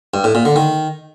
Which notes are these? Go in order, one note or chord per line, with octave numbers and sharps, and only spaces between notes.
G2
A2
A#2
D3
D#3